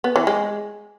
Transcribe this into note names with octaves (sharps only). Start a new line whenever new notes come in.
B3
E3
G#3